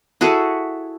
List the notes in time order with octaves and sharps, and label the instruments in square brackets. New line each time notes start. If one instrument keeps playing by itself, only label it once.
[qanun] E4 F#4 G#4 A4